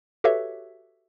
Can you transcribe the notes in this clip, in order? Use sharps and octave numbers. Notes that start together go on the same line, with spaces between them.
F#4 G4 A4 B4 C#5 E5